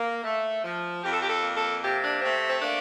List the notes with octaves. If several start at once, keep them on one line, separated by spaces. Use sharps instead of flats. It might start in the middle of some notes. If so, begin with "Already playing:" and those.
Already playing: A#3
A3
F3
F2 G4
A4
G4
A4
A#3
A4
C3 G4
D4
A3 C4
C4
A#3 D4